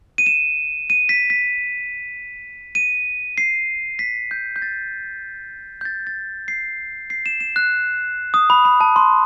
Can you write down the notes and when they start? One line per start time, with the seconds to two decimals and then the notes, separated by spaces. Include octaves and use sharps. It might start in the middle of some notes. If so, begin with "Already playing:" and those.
0.18 D#7
0.26 E7
0.90 D#7
1.09 B6
1.30 B6
2.75 D#7
3.38 C7
3.99 B6
4.31 G6
4.56 G6
4.62 A6
5.81 G6
5.85 A6
6.07 A6
6.48 C7
7.10 C7
7.26 E7
7.40 E7
7.56 F#6
8.34 D#6
8.50 B5
8.65 B5
8.81 A5
8.96 C6